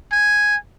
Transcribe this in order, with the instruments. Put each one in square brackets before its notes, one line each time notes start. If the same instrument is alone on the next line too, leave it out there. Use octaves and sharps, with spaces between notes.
[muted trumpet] G#5